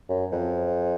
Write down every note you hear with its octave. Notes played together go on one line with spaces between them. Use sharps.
F#2
F2